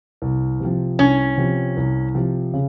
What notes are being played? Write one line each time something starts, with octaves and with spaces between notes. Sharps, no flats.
C2
C3 F3
C2 C#4
C3 F3
C2
C3 F3
C#3